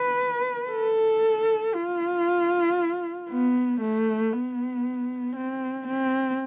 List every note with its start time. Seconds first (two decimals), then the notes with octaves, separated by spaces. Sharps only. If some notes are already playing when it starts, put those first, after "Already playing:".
Already playing: B4
0.71 A4
1.75 F4
3.30 B3
3.81 A3
4.33 B3
5.36 C4
5.87 C4